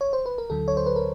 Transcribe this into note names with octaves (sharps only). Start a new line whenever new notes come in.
C#5
C5
B4
A#4
D2 D3 F#3 A4
C#5
C5
B4
A#4